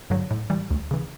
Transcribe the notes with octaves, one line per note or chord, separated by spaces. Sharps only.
G2 D3 F#3
A2
E3 G3
D2
C#3 E3